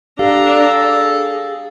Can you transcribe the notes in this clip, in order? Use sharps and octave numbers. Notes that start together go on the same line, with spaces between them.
D4 G4 A4 F5 A#5
G#4